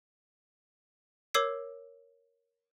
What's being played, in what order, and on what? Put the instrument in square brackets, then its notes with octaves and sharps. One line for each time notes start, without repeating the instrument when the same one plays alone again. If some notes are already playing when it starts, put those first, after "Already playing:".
[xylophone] A#4 C#5 D6 E6 G#6 C7